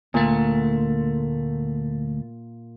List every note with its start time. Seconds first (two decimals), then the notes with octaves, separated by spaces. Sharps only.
0.14 D2 A#2 A3